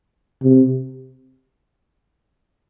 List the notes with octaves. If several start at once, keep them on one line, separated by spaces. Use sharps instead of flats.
C3